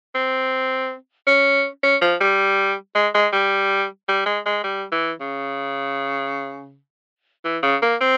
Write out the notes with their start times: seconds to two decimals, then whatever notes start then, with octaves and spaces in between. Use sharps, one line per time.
0.15 C4
1.27 C#4
1.83 C#4
2.02 F3
2.21 G3
2.95 G#3
3.14 G#3
3.33 G3
4.08 G3
4.26 G#3
4.46 G#3
4.64 G3
4.92 E3
5.21 C#3
7.44 E3
7.63 C#3
7.82 A#3
8.01 C4